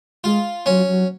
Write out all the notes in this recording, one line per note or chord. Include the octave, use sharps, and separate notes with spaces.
G#3 F4
F#3 C#4
F#3